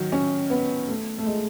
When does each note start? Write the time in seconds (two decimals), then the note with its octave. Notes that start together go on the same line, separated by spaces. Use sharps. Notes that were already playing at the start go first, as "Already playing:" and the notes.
Already playing: D#3 F#3
0.12 C#4
0.50 B3
0.88 A3
1.18 A3
1.26 G#3